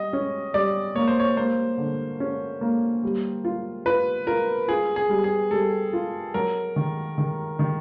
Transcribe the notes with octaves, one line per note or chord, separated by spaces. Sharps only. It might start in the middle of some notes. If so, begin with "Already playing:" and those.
Already playing: G3 D#5
C#4
G3 D5
A#3 C#5
C5
C#5
A#3 C5
D3
C#4
A#3
G3
F4
F4 B4
F4 A#4
F4 G#4
G#4
G3
G#4
G3 A4
F4
F#3 A#4
D#3
D#3
D#3